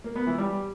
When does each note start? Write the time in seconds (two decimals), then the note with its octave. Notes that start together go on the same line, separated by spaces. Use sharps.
0.04 A#3
0.16 B3
0.27 E3
0.38 G3